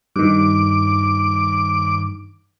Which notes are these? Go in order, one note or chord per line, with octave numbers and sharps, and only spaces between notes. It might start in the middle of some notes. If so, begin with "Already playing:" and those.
G2 D#3 D6